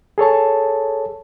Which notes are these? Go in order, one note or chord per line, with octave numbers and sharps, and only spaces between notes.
G#4 A4 C#5 A5